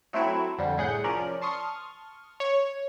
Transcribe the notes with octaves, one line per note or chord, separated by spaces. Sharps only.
F#3 A3 C4 E4 F#4
F2 D3 G3
C2 A2 G#4 F#5 G6
F3 C#4 A#4 D5
A5 C6 C#6 D#6 F6
C#5